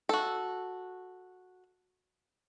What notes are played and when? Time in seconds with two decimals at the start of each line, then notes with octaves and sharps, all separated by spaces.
0.09 F#4 A4